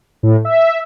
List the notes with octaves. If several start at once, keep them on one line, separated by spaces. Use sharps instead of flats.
A2
E5